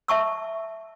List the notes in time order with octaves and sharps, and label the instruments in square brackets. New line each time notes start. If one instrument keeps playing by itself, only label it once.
[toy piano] E5 A5 C#6 E6